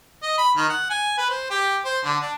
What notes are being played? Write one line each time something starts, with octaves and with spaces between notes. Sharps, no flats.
D#5
B5
D#3
F#5
G#5
B4
C5
G4
C5
D3
D4